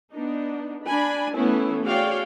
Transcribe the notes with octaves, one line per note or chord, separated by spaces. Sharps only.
B3 D4 D#4
D4 G#5 B5
E3 A3 B3 C#4 E4
F#4 G#4 C#5 D5 F5 G5